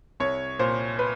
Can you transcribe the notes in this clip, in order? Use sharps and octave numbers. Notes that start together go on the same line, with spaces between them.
C2 C#5
A#2 C5
B4